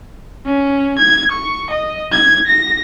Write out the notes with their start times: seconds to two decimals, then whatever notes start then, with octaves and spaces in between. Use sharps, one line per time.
0.45 C#4
0.99 G#6
1.32 C#6
1.70 D#5
2.12 G#6
2.47 A#6